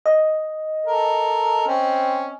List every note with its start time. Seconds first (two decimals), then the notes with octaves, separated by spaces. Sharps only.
0.06 D#5
0.85 A4 A#4
1.67 C4 C#4